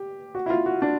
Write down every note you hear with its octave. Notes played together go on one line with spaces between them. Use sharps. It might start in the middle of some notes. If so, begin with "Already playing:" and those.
Already playing: G4
F#4
E4
F4
F#4
D4